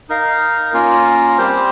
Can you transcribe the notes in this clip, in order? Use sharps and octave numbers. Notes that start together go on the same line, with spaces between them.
D#4 A#4 F5
A#3 C#4 F4 A#4
G3 C4 G4 C5